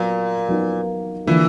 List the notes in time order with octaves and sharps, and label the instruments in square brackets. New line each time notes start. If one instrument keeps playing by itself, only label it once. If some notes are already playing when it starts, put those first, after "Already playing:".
Already playing: [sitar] A#2 [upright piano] F#3 B3
[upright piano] F#3 B3 D#4
[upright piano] D3 F3 A#3 [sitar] E3